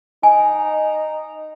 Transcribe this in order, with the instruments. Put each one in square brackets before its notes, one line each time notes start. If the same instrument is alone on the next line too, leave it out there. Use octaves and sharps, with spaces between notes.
[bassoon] D#4 [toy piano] G#5